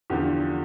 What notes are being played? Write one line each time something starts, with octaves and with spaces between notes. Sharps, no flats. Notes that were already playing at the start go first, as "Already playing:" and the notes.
E2 D3 F3 G4